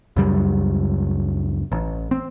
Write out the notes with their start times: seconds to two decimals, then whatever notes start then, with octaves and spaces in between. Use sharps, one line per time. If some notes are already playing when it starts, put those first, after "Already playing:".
0.17 C#2 F#2 G3
1.72 A1
2.11 C4